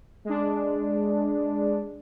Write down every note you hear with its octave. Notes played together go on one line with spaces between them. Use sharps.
G#3 D4